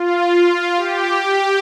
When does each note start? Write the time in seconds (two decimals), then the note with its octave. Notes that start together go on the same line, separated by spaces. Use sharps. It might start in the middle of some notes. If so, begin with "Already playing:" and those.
Already playing: F4
0.76 G4
1.17 G4